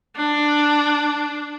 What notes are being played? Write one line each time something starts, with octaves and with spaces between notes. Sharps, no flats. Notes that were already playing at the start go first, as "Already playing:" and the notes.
D4